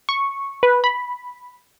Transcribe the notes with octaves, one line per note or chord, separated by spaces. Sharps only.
C#6
B4
B5